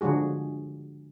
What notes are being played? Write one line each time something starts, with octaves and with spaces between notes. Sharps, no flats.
D3 F3 G#3 F#4 G#4